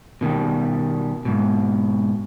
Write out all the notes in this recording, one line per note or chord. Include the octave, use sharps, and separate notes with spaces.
B2 D#3 F#3 G3
G#2 B2